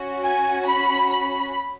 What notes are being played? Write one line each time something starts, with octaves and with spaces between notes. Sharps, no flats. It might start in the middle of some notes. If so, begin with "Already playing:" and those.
Already playing: C#4 F#4
G#5
B5
B5